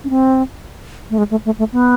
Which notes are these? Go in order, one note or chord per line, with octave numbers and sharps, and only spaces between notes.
C#4
C4
A3
G#3
A3
A3
A3
B3